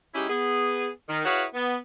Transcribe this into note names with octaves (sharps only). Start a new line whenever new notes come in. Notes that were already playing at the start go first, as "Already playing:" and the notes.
G#3 C#4 D#4 E4 G4
B3 G#4
D#3
E4 F#4 G#4 B4 C#5 F5
B3